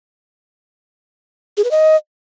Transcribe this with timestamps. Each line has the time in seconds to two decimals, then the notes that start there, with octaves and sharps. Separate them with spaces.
1.57 G#4
1.64 B4
1.71 D#5